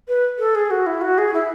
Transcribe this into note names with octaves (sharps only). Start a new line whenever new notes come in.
B4
A4
G#4
F#4
E4
F#4
G#4
E4